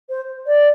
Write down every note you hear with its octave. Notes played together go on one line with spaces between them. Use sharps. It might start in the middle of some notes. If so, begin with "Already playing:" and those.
C5
D5